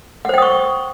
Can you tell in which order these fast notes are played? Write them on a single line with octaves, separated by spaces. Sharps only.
F#5 C5 G5 D#6 C#6